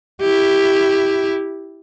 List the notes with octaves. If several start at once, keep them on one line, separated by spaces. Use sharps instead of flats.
E4 G4